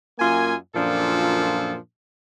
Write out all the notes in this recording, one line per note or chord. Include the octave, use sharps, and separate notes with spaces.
F#2 A#3 F4 G#5
F#2 A#2 F3 D4 A4